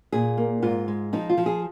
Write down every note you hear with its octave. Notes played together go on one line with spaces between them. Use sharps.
A#2 G#4
A#3
G#2 F4
G#3
F3 D#4
F4
F3
G#4